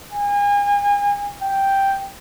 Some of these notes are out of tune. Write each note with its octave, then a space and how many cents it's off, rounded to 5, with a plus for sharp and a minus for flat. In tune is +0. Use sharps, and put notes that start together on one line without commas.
G#5 -35
G5 +0